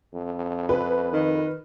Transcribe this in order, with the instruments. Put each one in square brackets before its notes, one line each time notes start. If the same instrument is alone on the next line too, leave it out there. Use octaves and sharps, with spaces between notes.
[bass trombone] F2
[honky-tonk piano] B4
[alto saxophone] D#3